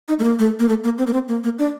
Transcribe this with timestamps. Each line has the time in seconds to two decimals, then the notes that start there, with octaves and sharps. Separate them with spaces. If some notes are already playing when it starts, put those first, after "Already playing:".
0.08 D#4
0.19 A3
0.24 A#3
0.39 A3
0.60 A#3
0.69 A3
0.84 A#3
0.98 C4
1.07 A#3
1.13 C4
1.28 A#3
1.44 A#3
1.59 D4